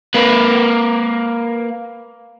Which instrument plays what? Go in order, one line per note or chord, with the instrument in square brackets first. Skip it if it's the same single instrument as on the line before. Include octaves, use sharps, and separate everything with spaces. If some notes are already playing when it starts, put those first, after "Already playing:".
[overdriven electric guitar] A#3 B4